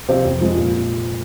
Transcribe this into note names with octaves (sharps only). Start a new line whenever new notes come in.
C3 F3 C4 F4
F2
C3 F3 G#3
A#2